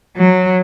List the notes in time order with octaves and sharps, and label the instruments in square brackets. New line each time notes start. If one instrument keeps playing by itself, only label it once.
[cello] F#3